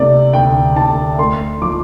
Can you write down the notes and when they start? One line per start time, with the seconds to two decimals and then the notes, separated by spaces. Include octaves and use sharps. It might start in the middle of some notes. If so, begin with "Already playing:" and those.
Already playing: C3 A3 D5
0.33 D2 G5
0.76 D2 A5
1.18 A3 C6
1.61 F3 D6